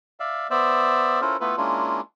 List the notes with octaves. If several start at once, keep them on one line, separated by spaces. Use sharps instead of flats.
D5 E5 F5
B3 C5 D5 E5
C#4 E4 F4 A4 A#4 C5
A3 B3 E4 F4 A4 B4
G#3 A#3 C#4 D4 E4 F4